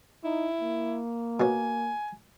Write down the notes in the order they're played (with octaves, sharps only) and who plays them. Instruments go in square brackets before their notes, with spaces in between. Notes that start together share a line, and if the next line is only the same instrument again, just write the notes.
[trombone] D#4 [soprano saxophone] E4
[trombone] A#3
[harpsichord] B2 C#4 [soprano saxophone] G#5